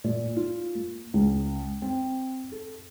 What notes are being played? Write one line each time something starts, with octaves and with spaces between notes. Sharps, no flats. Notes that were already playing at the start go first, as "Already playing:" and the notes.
A#2
F4
A#3
C#2
C4
A4